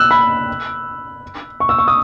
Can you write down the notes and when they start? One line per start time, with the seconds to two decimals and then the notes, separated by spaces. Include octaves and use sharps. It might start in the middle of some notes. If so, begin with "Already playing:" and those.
Already playing: E6 F#6
0.11 B5
1.60 C#6
1.69 E6
1.78 C#6
1.88 D#6